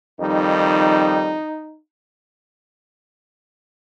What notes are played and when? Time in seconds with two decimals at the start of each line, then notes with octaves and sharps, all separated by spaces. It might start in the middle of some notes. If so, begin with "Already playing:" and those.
0.19 F2 D#3 G3 D#4